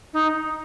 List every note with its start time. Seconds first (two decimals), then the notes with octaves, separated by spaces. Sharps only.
0.13 D#4